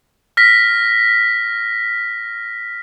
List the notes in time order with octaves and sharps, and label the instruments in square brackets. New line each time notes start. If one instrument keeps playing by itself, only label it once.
[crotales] F6 A#6 B6